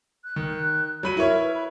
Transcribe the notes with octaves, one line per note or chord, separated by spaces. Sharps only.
F#6
D#3
F#3 B5 D#7
E4 A#4 C#5
B4
B5